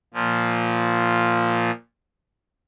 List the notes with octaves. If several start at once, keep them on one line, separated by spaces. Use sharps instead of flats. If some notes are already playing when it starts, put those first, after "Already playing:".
A#2 F3